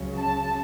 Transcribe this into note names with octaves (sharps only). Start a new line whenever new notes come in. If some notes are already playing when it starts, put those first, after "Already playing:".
Already playing: C#2 C#3 F#3
A5